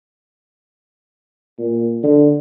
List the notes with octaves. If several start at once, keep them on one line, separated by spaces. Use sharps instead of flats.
A#2
D3